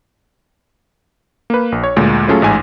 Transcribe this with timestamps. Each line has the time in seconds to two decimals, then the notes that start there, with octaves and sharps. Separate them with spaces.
1.50 A#3 B4
1.72 A#1
1.84 C#5
1.96 D2 A#2 G#3
2.28 F#3 A3 C#4 F4 G#4 A4
2.42 A1 G#2 G#5